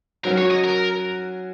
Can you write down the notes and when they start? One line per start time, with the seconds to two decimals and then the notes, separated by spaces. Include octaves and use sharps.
0.24 F#3 C#4 F#4 A#4
0.38 C#5
0.51 D#5
0.64 A#4